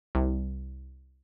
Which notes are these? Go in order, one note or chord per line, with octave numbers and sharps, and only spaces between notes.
C2